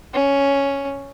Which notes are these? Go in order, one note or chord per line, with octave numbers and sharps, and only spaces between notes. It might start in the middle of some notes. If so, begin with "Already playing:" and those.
C#4